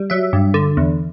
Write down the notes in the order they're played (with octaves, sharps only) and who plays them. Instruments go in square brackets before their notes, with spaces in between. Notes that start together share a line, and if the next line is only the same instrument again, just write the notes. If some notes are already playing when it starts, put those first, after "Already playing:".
Already playing: [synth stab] G3
F#3 E5
G2
D3
E2